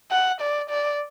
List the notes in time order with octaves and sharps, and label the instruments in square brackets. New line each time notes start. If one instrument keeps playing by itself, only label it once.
[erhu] F#5
D5
D5